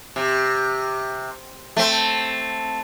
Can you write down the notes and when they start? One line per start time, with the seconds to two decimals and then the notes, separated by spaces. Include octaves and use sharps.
0.16 C3
1.77 A3 C4